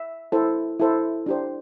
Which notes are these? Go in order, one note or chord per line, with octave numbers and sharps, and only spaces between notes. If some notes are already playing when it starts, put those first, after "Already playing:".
Already playing: E5
E4 A4 C5
E4 A4 C5
D4 G4 C5